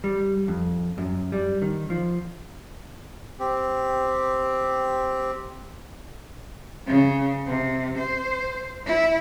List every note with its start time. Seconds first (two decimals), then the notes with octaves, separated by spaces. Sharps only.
0.04 G3
0.48 F2
0.98 F#2
1.32 G3
1.62 D#3
1.90 F3
3.39 C4 G4
6.87 C#3
7.46 C3
7.98 C5
8.86 E4